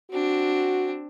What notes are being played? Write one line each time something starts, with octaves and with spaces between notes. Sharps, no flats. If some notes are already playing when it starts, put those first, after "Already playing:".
C4 D4 F#4